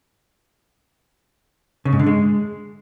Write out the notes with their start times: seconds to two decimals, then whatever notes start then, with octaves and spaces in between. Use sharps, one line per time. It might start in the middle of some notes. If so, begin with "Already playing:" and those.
1.85 C#3
1.92 G#2
1.99 D3
2.06 G#3